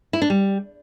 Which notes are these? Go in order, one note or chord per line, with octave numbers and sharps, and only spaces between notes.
E4
D4
G3